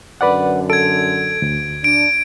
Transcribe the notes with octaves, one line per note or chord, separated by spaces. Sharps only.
F#2 D3 B4 D5 F#5
A4 G#6 D7
D2
D4 D7